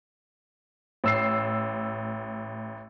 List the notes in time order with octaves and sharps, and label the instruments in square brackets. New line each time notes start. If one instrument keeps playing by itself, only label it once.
[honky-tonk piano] A1 E6 C7